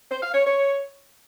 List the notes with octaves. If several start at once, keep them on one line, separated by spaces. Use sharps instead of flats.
C5
F5
C#5
C#5